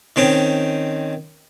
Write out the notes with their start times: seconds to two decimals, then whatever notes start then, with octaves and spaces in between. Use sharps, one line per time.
0.16 D#3 C4 C#4